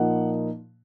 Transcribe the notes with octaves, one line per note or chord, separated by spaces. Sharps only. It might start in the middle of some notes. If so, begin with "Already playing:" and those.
Already playing: A#2 F3 A#3 D#4 F#5